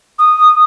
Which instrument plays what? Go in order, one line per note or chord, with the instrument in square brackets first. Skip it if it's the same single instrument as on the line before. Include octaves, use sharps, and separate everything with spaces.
[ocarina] D#6